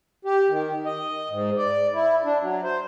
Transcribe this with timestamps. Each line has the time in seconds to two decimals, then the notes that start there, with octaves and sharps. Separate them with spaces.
0.25 G4
0.49 D#3
0.86 D#5
1.29 G#2
1.57 D5
1.94 E4
2.25 D4
2.41 F#3
2.64 C5